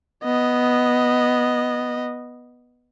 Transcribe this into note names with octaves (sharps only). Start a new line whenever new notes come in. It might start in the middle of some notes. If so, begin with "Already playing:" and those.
B3 D#5